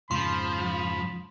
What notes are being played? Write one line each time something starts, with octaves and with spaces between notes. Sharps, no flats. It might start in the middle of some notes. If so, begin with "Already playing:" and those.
F2 G#2 C#3 F3 B5 C6